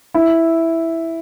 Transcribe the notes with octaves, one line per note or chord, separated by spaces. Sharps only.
E4